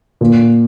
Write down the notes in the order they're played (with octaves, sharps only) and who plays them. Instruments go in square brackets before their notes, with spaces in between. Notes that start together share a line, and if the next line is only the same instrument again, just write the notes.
[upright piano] A#2